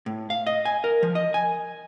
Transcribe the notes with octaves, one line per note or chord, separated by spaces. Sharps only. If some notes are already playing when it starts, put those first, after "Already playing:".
A2
F5
D#5
G#5
A#4
F3
D#5
G#5